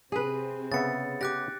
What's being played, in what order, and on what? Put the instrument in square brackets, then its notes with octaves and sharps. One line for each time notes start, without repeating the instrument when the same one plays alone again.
[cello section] C3 C4 [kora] G#4 B4
[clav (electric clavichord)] C#3 B3 E5 [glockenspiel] A6 C#7
[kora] G4 [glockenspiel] D6 F#6 A#6